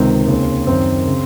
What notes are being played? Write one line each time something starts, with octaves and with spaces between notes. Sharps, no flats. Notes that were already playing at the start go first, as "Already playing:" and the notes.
Already playing: C#2 C3 D#3 C4
D#2 C#3
F#2 D#3 C4
C#3